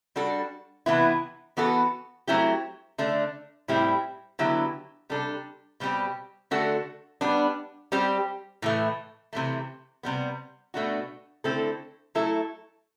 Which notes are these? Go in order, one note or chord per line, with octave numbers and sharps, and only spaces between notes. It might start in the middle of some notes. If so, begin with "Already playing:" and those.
G3 D4 F#4 A4
C3 E3 B3 E4
E3 B3 F#4 A4
F#3 A3 C4 E4 G4
D3 A3 D4
A2 G3 C4 E4 G4
D3 F#3 B3 E4 G4
C3 G3 D4 A4
B2 G3 C4 G4
D3 A3 D4 F#4 A4
G3 B3 D4
G3 C4 G4
A2 E3 A3
C3 E3 A3
C3 G3 B3
B2 A3 D4 F#4
D3 A3 C4 E4 A4
F#3 A3 E4 A4